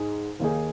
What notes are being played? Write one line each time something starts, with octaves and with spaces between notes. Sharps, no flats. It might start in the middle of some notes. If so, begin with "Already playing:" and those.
Already playing: G#2 G#3 D#4 G#4
D#2 D#3 A#3 D#4 G#4